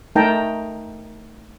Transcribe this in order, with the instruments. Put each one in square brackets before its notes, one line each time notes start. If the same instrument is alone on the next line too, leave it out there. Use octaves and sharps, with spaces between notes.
[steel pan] A3 D#4 A#4 G5 A5 A#5